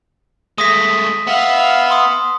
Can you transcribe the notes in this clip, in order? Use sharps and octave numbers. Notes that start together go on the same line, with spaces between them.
G#3 A3 D#6 A#6 B6
B3 E5 F5
C6 D#6